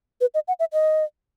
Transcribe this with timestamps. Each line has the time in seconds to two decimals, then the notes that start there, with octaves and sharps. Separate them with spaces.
0.21 B4
0.34 D#5
0.48 F#5
0.60 E5
0.73 D#5